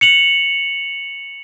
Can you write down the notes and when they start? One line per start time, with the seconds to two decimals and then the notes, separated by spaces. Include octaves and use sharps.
0.01 C#7 F7 F#7